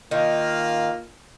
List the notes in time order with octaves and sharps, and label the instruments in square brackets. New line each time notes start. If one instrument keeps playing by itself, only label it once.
[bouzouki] D#3 [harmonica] A#3 F4